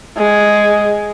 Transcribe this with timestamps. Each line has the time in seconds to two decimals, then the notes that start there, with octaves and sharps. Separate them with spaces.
0.18 G#3